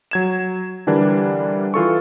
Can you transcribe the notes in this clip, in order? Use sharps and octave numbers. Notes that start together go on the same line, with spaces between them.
F#3 G#6 E7
D3 E3 G3 D4 A#4
E3 F4 A4 C#6